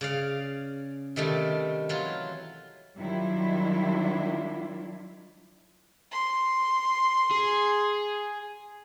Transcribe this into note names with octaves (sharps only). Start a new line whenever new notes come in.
C#3 D5 F5
C3 D#3 G3 A3
E3 F#3 F4
D#3 F#3 G3 D4 E4 F4
C6
G#4